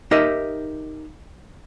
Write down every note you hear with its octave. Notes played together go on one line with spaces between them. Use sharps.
D#4 G4 A#4 D#5 E5